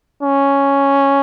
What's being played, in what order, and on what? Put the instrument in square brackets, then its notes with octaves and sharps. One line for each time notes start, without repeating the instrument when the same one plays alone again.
[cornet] C#4